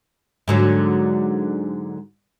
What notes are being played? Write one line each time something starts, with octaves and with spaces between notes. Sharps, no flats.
G#2 D3 F#3